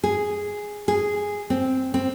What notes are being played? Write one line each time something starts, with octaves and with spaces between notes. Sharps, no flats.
G#4
G#4
C4
C4